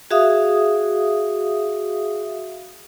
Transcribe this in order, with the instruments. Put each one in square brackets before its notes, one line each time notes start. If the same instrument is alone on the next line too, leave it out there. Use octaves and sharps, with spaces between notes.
[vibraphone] F#4 G#4 E5 F5 D#6